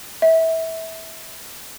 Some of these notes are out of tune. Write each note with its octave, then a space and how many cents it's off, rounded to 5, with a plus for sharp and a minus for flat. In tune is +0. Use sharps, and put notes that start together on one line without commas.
E5 -20